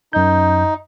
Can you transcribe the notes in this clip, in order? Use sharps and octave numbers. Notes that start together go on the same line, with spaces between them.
F#2 D#4 G6